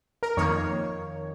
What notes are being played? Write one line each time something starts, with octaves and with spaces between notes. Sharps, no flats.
A#4
F2 D#3 A#3 C#5